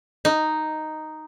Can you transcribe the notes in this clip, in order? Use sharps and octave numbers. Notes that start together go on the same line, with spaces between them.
D#4